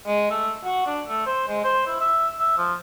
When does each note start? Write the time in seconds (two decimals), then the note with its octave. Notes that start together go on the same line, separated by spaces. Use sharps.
0.06 G#3
0.30 A3
0.64 F#4
0.87 D4
1.07 A3
1.26 C5
1.48 G#3
1.64 C5
1.87 E4
2.00 E5
2.39 E5
2.57 F3